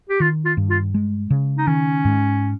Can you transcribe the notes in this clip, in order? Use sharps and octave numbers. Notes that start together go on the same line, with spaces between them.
G4
D#3 F4
F4
G2
F4
G#3
C#3
D#4
D#3 C#4
G#2